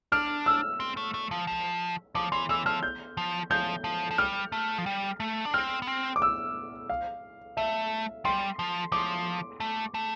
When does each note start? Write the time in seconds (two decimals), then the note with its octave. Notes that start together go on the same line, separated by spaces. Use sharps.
0.12 D4 F6
0.46 E6
0.80 C4
0.97 A3
1.14 A3
1.31 F3
1.47 F3
2.15 F3 D6
2.32 E3 C6
2.49 E3 E6
2.66 F3 F6
2.83 G6
3.17 F3
3.51 F3 G6
3.84 F3
4.11 F3
4.18 G3 F6
4.52 A3
4.78 F3
4.86 G3
5.20 A3
5.45 D4
5.54 C4 F6
5.82 B3
5.87 C4
6.16 D6
6.22 E6
6.90 F5
7.57 A3 E5
8.25 G3 C6
8.59 F3
8.92 F3 D6
9.60 A3
9.94 A3